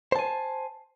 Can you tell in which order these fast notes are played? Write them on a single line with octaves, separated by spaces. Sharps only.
C5 A5 G#5